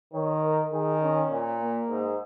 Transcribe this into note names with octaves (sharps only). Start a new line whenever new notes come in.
D#3 C#5
A#4
D#3 G#4
C#4
A#2
A#3
G#2